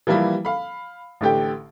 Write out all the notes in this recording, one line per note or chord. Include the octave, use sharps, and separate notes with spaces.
E3 F3 G3 A#3 E4
F5 B5
A1 D3 G4 G5